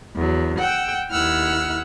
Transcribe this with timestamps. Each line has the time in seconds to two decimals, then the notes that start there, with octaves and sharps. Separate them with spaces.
0.16 E2 F#3
0.59 F#5 G5 E6
1.12 D#2 E4 F#5 E6 F6